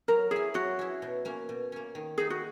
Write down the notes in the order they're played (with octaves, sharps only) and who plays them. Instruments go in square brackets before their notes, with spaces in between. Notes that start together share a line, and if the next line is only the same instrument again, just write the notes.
[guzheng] F#3 [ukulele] A#4
[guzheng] C#4 E4 [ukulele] G#4
[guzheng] F#3 [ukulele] F#4
[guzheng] C#4 E4
B2
A#3 C#4
B2
A#3 C#4
D#3
[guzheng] A#3 D#4 [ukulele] G#4
[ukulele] F#4